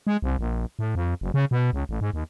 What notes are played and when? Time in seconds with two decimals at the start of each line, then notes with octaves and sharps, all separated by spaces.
0.07 G#3
0.22 C2
0.39 A#1
0.79 A2
0.95 F2
1.21 F#1
1.34 C#3
1.51 B2
1.73 C#2
1.89 A1
2.01 G#2
2.14 D#2